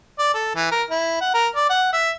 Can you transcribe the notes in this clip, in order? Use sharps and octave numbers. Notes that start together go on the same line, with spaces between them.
D5
A4
E3
A#4
E4
F#5
A#4
D5
F#5
E5